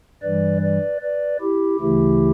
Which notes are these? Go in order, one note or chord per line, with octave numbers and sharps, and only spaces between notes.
G2 E3 G3 B4 D5
B4 D5
B4 D5
E4 G4
D2 C#3 E3 A3 E4 G4